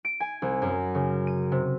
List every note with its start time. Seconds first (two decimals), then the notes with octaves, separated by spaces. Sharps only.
0.05 D7
0.20 G#5
0.42 C2
0.62 F#2
0.95 C#3
1.27 D#7
1.52 C3